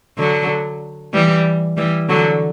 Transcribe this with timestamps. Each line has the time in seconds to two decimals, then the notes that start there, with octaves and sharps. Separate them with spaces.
0.18 D3 F#3
1.14 E3 G3
1.77 E3 G3
2.09 D3 F#3